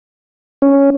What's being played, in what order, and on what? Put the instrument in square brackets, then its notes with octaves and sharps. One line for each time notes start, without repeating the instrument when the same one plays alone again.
[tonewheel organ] C#4